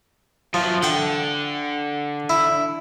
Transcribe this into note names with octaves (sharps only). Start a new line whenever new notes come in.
F3 F#3 E5
D3 F#5 G5
E4